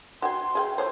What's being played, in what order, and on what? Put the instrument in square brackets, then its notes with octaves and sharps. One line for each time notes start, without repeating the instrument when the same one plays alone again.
[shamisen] F#4 G5 G#5 [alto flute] C6
[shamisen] G#4 F5 G5
[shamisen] F3 A3 C5 [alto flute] C#5